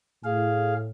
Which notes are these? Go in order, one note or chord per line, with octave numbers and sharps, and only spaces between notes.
A2 G#4 F5